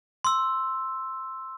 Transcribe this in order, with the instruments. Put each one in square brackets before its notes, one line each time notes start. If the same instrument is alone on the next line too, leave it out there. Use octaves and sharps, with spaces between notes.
[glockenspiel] C6 E6